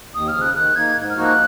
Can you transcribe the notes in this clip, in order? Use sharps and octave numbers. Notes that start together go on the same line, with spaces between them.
D#2 D#6
F6
C#3 F3
F#6
D#3 F#6
A#3 D#4 G#6
G#2
F6
F3 A#3 D#4 F#4
F#6